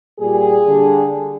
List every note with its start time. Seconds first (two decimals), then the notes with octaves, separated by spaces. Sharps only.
0.20 A#2 G3 G#4
0.66 D3 G3